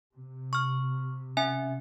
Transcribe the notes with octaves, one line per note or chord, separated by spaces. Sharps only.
C3
C#6 F6
C#4 E5 G#5